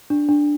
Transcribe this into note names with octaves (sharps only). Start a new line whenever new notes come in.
D4
D4